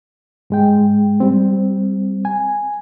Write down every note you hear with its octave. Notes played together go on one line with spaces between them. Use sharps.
G#2 G#3 G5
G3 C4
G#5